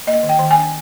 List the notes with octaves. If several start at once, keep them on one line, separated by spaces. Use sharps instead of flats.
A#3 D#5
D#3
G5
D#3
D4 G#5